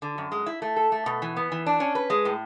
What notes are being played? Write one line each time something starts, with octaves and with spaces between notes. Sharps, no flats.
D3
F#2
G#3
E4
A3
A4
A3
B2
E3
B3
E3
D4
C#4
B4
G#3
A2